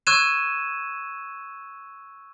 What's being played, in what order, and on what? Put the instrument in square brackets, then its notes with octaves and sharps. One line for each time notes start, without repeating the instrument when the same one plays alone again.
[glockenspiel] C#6 E6 F#6 G#6 D#7 E7